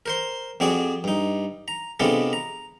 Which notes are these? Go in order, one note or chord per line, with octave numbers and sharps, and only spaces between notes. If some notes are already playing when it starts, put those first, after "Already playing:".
A#4 C5 C6
F2 C4 F#4 G#4 D5
G2 D#4
A#5
C3 G#3 B3 D4 F4 A4
A#5